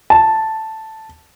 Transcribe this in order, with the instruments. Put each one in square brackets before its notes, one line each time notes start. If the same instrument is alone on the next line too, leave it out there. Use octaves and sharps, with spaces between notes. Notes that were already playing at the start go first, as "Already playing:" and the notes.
[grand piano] A5